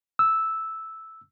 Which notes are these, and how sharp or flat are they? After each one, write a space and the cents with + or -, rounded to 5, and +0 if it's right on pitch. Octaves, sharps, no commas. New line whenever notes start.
E6 -5